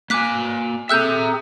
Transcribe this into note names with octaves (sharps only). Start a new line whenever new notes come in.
A#3 G#5 D6 F#6 B6
C4 G#4 A4 E5 A#5 E6 F#6 G6